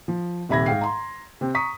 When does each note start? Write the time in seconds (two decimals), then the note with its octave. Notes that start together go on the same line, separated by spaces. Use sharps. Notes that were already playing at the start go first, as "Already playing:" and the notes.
0.08 F3
0.49 D#1 C3 E5 B5 G#6 A#6
0.66 G#2 F5 G5 C7
0.81 A#5 C6
1.41 C3 C4
1.54 A#5 C#6 D#6 B6